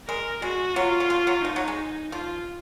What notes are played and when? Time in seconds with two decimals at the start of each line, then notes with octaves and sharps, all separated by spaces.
0.08 G#3 A#4
0.42 G#3 F#4
0.76 F#3 F4
1.00 F#3
1.10 F3
1.27 F#3
1.44 F3 D#4
1.56 F#3
1.68 G#3
2.12 F3 F4